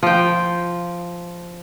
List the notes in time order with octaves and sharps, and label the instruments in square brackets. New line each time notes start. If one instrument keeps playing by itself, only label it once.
[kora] F3 G5